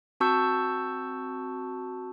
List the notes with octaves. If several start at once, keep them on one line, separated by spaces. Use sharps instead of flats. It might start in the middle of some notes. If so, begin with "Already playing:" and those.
C4 F#4 A5 C#6 E6 G6